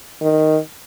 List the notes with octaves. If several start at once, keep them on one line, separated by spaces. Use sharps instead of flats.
D#3